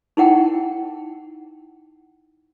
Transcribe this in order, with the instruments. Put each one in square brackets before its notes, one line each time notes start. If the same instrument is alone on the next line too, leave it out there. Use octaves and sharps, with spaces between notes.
[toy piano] D#4 E4 F#5 G5